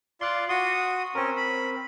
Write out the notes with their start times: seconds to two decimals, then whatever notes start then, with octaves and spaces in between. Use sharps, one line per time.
0.21 F4 D5 C6 F#6
0.49 F#4 C6 D#6
1.15 C4 C#4 A#4
1.37 B5